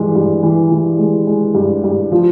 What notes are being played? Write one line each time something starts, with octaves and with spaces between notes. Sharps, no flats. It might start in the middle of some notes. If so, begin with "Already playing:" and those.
Already playing: G2 E3 G#3
G2
E3
E3
G#3
G#3
G2
G2
F3